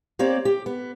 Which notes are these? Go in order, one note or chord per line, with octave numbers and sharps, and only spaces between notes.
A#3 C4 G4 C#5 D5
G4
B3